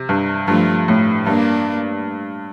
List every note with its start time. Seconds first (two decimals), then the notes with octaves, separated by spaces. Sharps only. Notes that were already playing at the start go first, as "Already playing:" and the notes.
Already playing: C3
0.09 G2
0.48 G2 F3 A3
0.88 A2
1.26 G2 A#3 D4